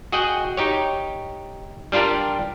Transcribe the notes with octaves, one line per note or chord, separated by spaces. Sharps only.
F#4 G#4 D#5 F#5 G5
D#4 G4 C#5
G3 D4 F4 G4 A#4